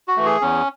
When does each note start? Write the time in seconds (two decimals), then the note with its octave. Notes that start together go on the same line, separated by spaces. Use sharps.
0.08 F#4
0.17 E3 A3
0.25 G#4
0.42 E2 C#4